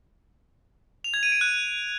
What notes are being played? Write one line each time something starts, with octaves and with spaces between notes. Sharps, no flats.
F7
G#6
D#7
D7
F#6